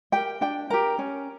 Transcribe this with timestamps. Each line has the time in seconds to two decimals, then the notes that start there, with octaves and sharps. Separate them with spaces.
0.12 G4 A#4 G5
0.41 D4 G5
0.70 G4 A#4 A#5
0.99 C#4